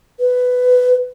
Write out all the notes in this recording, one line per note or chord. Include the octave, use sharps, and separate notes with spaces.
B4